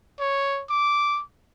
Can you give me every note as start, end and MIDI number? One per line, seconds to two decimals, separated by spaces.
0.19 0.63 73
0.69 1.22 86